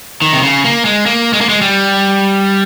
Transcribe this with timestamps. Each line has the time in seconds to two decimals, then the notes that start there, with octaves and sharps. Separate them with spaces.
0.22 D#3
0.33 C3
0.43 C#3
0.64 A#3
0.85 G#3
1.06 A#3
1.33 G#3
1.41 A#3
1.49 G#3
1.62 G3